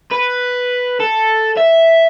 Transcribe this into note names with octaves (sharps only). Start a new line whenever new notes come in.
B4
A4
E5